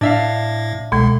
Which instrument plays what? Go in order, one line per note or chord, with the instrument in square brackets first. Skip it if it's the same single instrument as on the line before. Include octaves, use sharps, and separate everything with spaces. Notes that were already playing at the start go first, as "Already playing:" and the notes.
[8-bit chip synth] A2 [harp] D4 E5 F5
[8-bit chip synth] C2 [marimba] B2 G#3